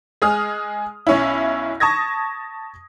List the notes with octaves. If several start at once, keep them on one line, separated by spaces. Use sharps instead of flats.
G#3 G#4 D#6 F6
B1 C#4 E4
A5 C#6 D#6 G#6 A#6